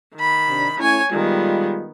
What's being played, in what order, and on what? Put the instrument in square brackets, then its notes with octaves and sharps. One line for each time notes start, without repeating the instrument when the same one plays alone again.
[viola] D#3 B5
[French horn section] C3 D4
[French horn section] A3 C#4 E4 [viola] C#5 G#5
[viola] D#3 B3 [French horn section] G3 G#3 F4